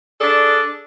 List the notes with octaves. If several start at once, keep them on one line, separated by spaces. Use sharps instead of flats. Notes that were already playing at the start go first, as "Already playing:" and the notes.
D4 G#4 A4 D5